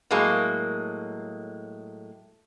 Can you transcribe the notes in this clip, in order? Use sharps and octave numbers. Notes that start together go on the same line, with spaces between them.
A2 F#3 G#3 A#3